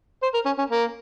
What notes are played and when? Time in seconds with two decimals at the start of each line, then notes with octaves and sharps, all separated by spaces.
0.23 C5
0.34 A#4
0.46 C#4
0.58 C#4
0.70 A#3